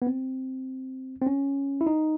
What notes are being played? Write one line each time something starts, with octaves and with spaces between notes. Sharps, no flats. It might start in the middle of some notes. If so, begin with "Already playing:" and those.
B3
C4
C4
C#4
E4
D#4